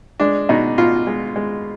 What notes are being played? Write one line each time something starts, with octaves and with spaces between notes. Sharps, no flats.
G#3 D4
B2 D#4
B2 F4
G#3
G#3